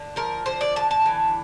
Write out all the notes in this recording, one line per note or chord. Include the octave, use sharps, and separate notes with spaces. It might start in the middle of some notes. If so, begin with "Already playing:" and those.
Already playing: D3
F3 A#4
D3 C5
D5
D3 A5
A5
E3